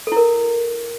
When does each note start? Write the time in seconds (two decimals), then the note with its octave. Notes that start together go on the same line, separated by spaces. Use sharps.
0.07 A4
0.12 E4
0.16 A#4